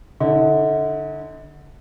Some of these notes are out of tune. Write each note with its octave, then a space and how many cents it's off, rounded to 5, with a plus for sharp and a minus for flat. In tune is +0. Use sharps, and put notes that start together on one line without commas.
D3 +0 D#4 +45